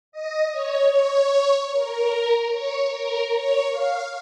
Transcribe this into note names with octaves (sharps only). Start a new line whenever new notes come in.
D#5
C#5
C#5
A#4
C#5
A#4
C#5
F5